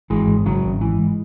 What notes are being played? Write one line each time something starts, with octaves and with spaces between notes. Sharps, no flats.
G#1 E3 G#3
G#2
G#1 C#3 F#3
G#1
G#2 E3
G#3